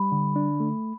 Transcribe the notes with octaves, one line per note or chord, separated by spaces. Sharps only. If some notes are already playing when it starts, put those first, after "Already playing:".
Already playing: G3 B5
D3
D4
A3